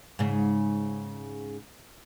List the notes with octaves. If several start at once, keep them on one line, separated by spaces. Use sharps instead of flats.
G#2 C#3